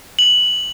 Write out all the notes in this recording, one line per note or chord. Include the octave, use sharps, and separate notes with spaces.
F#7